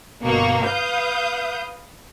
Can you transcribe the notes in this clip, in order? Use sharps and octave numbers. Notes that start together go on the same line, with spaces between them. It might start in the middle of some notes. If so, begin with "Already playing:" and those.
G1 B2 A#3 C#6
B4 F5 D#6 G6